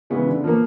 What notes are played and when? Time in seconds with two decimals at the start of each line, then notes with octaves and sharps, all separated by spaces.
0.10 C#3 E3 G#3 B3
0.27 D3
0.44 F3 A#3